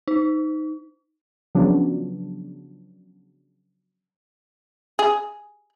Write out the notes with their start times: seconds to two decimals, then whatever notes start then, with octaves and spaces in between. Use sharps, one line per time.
0.08 D#4
1.55 C#3 F3 F#3 B3 D4
4.99 G#4